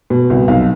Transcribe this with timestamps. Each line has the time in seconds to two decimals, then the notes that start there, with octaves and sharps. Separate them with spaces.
0.10 B2
0.30 C2
0.48 B1 F5